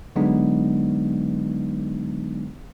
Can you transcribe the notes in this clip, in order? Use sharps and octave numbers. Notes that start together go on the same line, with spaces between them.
D3 F#3 G#3 B3 D4 D#4